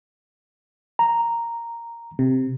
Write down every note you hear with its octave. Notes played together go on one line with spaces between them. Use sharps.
A#5
C3